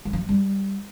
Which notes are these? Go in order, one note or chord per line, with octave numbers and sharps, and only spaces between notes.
G3
F3
F#3
G3